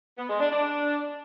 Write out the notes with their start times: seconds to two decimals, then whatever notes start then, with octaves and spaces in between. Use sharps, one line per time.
0.18 B3
0.29 G#3
0.40 D4
0.51 D4